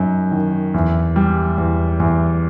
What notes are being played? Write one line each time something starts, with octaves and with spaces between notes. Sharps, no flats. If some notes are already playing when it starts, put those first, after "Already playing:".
Already playing: F#2 D#4
D#3
E2
G3
E2
E2